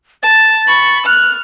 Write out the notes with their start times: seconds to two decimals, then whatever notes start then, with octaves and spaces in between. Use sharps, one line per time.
0.23 A5 A6
0.67 B5 C#6
1.06 F6 F#6